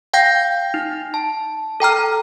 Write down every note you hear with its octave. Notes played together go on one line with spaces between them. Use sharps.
F5 G5 G6 A#6
D#4
A5
A4 G5 A#5 F6